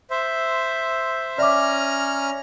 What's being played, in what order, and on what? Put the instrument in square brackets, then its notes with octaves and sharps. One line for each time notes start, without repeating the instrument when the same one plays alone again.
[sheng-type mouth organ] C5 E5
[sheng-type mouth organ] C#4 A#5 F6 [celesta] D5 E5 D6